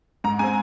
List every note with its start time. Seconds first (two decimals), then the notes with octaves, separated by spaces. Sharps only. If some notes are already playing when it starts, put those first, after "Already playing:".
0.24 G#2 A#5
0.39 G#3 C4 G#5